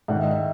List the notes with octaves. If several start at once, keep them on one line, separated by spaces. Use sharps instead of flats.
G#2 D#3 F#5
E5
D#5
E5